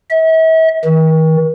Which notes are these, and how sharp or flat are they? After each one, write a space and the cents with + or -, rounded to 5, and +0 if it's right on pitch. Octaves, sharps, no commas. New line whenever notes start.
E5 -40
D#3 +40